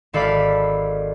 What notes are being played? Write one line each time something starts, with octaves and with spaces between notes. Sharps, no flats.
G#1 A4 D5 F5 B5 B6